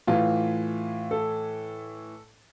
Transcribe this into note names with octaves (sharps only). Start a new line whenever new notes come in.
A2 E3 F4
A4